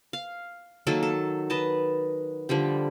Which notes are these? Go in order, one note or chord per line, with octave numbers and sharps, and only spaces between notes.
F5
D#3 F#3 A#3 A4
A4
B4 D#5 A5
D3 F3 G3 G4